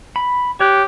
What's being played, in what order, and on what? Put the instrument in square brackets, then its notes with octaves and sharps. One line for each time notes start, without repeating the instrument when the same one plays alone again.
[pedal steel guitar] B5
[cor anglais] G4 [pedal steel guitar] C#5 F#6